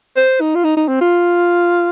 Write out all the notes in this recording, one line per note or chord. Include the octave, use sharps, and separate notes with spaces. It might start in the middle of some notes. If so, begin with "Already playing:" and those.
C5
D#4
F4
D#4
D#4
C4
F4